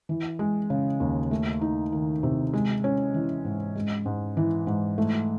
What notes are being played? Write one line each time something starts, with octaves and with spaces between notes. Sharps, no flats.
E3
G#3
C#3
D#2
A3
D#4
D#3
C3
G#3
C#4
E3
G#2
G#3
G#2
E3
G#2
A3